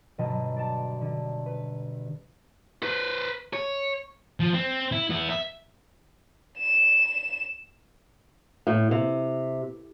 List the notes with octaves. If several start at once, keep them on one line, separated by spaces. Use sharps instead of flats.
G1 B2 F#3 B4 D#5 A5
D5 A5
D3
B4
B4 C5
C#5
F3
C4
E4
B3 E4
E5
E7
A2
C3